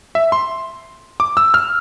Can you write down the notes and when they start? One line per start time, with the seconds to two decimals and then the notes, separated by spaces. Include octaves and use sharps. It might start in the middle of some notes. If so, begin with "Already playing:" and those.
0.15 E5
0.32 C6
1.20 D6
1.37 E6
1.54 F6